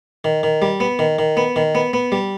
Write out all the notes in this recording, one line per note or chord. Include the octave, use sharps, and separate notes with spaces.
D#3
D#3
G3
B3
D#3
D#3
B3
D#3
B3
B3
G3